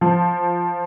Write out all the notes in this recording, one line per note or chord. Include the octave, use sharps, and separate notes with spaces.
F3